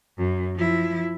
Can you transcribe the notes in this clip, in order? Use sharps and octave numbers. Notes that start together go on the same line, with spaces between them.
F#2
F3 E4